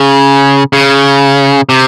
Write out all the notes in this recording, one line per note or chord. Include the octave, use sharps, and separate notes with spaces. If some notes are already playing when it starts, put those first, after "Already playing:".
Already playing: C#3
C#3
C3